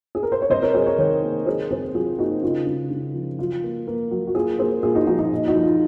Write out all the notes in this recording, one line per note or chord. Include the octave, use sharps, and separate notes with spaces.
G#4
A#4
C5
C#5
C3 C5 D#5
A#4 C#5
F#3 G#4 C5
A#4 C#5
D#3 A#4 C#5
A#3
F#3 G#4 C5
C3 G#4 C5
F#3 F4 G#4
A#3 D#4 F#4
C#3 F4
C#3
C#3
F3
F#3 F4
A#3
A#3
F#3
F#4
A#3 F4 G#4
A#3 G#4 C5
A#2 F4 G#4
D#4 F#4
F3 D#4 F#4
D#4
A#2
D#4 F#4
F3
F4